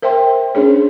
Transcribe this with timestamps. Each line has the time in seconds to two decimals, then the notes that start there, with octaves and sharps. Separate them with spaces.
0.02 A#4 C5 E5 G5 C6
0.55 C#4 D4 G#4 C#5